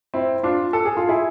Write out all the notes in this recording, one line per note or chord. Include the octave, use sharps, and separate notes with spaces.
C4 E4
D4 F4
A4
G#4
F4
E4 G#4